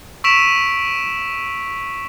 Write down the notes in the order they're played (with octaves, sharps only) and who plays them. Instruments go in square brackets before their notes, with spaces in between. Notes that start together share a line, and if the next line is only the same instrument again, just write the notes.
[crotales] C#6 E6 B6 D7 E7 F7